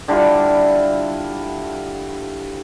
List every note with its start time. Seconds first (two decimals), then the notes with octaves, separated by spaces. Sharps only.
0.08 D3 G3 E4 F4